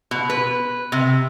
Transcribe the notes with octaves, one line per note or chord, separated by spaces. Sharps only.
B2
B4
C3